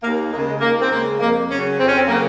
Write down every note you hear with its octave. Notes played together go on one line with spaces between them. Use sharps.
D#2 A#3
C#3 G#3 A#3
G#3
D#2 A#3
C4
C#3 G#3 A#3
F2 A#3
C#3 F#3 C#4
F2 C4
C#4
C4
C#3 F#3 A#3